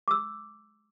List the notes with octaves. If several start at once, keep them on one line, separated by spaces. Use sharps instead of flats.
D6 E6